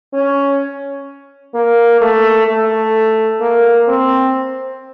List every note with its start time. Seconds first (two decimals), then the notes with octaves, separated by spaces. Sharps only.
0.14 C#4
1.54 A#3
2.01 A3
2.47 A3
3.41 A#3
3.88 C4